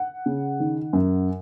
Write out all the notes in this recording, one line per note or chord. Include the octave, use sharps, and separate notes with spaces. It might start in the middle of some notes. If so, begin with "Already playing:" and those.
Already playing: F#5
C#3
D#3
F#2